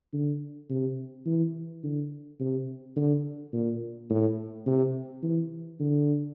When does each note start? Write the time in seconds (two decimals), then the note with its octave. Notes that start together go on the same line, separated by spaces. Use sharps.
0.13 D3
0.69 C3
1.26 E3
1.83 D3
2.40 C3
2.96 D3
3.53 A#2
4.10 A2
4.66 C3
5.23 E3
5.80 D3